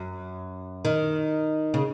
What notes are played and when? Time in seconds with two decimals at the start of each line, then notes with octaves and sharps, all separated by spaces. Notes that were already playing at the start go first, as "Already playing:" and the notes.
Already playing: F#2
0.85 D#3
1.74 C#3